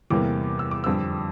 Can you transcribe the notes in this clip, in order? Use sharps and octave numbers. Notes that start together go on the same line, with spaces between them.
E2 C3 E3 G3 A#3 D6
E6
D6
F2 D3 G3 E6